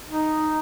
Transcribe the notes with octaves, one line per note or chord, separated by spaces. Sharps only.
D#4